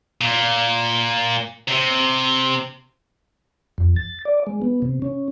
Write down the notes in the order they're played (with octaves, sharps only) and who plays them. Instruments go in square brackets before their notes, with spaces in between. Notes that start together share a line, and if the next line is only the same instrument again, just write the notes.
[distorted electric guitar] A#2
C3
[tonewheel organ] F2
A6
D5
G#3
B3
C3
C#4